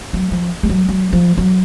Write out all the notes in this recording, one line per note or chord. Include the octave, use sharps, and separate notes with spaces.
F#3
F3
G#3
F#3
F#3
F3
F#3